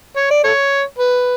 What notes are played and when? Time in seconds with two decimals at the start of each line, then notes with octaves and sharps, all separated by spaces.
0.16 C#5
0.31 D5
0.44 A4 C#5
0.98 B4